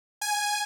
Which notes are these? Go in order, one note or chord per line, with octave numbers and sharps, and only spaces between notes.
G#5